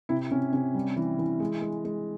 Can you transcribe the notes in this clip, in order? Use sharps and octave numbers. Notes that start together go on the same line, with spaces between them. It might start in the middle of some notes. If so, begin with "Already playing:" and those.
C3 E4
C3 C#4
C3 C#4
G3
E3
E3
G#3
G#3
G#3